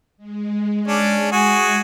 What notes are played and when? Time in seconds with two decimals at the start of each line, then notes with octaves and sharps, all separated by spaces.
0.17 G#3
0.88 C#4 D4 D5
1.32 F#4 G#4 G#5